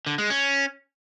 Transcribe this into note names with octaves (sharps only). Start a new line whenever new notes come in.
D3
G#3
C#4